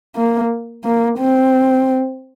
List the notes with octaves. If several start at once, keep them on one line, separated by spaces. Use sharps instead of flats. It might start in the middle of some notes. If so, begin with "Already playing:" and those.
A#3
A#3
C4